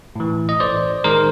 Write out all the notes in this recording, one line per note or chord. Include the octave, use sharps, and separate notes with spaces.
A2 E3
D#5
A1 C5 D5
D#3 G#3 A#4 C5